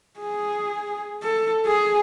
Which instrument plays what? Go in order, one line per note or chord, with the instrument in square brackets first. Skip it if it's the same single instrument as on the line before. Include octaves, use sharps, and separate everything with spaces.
[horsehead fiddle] G#4
A4
G#4